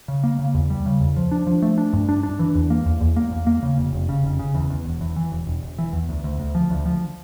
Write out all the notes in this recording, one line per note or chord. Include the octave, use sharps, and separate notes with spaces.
C#3
A#3
C#3
E2
G3
C#3
E2
F3
D4
F3
A3
D4
G2
D4
D4
E3
E2
A#3
E2
E2
A#3
E2
A#3
C#3
F1
F1
C#3
F1
C#3
E2
E2
E1
E2
E3
E1
E1
E1
E3
E2
D2
D2
D2
F3
D2
F3